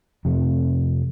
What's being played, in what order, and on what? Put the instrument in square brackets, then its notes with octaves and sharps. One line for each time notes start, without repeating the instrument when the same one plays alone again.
[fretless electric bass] F2 C3 A3